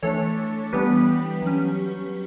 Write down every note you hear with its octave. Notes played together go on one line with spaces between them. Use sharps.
E3 A3 D4 A4 C#5
E3 G3 B3 D4 G4 B4
F#3 C#4